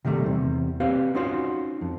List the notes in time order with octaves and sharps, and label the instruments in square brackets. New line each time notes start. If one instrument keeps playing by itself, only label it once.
[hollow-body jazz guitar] C3 D#3 G3 A3
E2 C3
C4 G4 B4 F5
C#4 D#4 F4 F#4 C5
F2